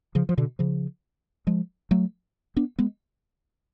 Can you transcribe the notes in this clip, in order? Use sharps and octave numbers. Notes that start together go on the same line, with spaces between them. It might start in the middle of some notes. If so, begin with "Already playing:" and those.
C#3 F3
F3
B2 D3
C#3 F3
F3 G#3
F#3 A3
B3 D4
G#3 B3